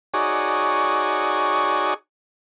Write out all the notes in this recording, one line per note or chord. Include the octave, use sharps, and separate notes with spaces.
D#4 F#4 G#4 C#5 D5